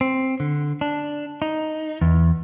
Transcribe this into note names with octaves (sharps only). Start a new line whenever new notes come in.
C4
D3
D4
D#4
E2